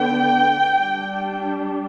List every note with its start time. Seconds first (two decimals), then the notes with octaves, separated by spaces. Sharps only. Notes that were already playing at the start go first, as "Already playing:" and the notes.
Already playing: D3 B3 D4 G5
0.78 G3 D4